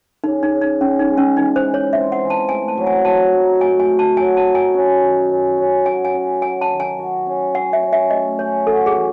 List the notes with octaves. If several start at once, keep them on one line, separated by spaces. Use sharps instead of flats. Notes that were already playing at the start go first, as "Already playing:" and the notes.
C#3 D#4
D#4
C#3
D#4
C#3 C#4
D#4
G#3
C#4
E3 D#4
C5
E3
C#5
C4 E5
F#5
E3
A5
A3 G#5
A5
F#3
G#5
F#3 A5
D#4
A3 G#5
G#5
A4
A5
F#3 G#5
A5
D#4
G#5
C#4
D#3
C#4
C#4
F#3 G#5
G#5
C#4
F#3 G#5
A5
D#3
G#5
F#4
C#4
C#4 F#5
E5
C#4
E5
A3 D#5
C#4 C#5
F#4 A4
G#4
E3